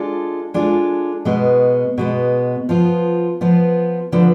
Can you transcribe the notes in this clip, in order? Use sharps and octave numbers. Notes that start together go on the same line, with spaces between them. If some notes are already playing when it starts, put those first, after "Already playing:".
Already playing: G#3 D4 F4 A4
G#3 D4 F4 A4
B2 G#3 B3
B2 G#3 B3
F3 B3 F4
F3 B3 F4
D3 F3 B3